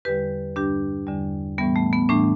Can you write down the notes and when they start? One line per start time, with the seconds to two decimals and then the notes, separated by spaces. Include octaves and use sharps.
0.05 E2 D3 G3 G4 B4
0.56 G2 D3 G3 D4 G4
1.07 E2 D3 G3
1.58 A2 E3 G3 B3
1.76 A3
1.93 B3
2.09 A2 E3 G3 A3 D4